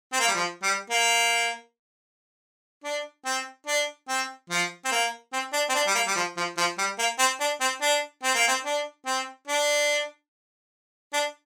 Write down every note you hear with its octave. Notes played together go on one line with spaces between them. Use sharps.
C4
A#3
G3
F3
G3
A#3
D4
C4
D4
C4
F3
C4
A#3
C4
D4
C4
D4
G3
A#3
G3
F3
F3
F3
G3
A#3
C4
D4
C4
D4
C4
A#3
C4
D4
C4
D4
D4